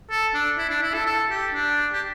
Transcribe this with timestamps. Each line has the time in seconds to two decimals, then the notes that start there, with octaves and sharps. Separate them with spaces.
0.10 A4
0.34 D4
0.58 E4
0.69 D4
0.82 E4
0.94 A4
1.06 A4
1.30 G4
1.53 D4
1.93 G4